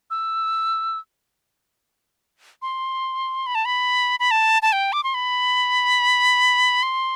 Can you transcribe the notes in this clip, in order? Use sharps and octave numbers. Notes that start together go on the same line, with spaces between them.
E6
C6
B5
A5
B5
B5
A5
A5
G5
D6
C6
B5
C6